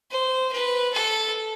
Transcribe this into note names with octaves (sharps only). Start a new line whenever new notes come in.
C5
B4
A4